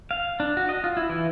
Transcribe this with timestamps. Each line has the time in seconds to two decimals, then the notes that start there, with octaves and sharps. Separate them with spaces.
0.11 F5
0.40 D4
0.57 F#4
0.69 D#5
0.84 F4
0.97 E4
1.09 E3